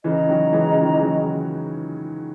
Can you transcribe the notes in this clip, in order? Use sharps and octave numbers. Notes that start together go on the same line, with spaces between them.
C#3 E3 G#4 D#5 A#5
D#3 F#3
E3 G#3
C#3
D#3
E3
F#3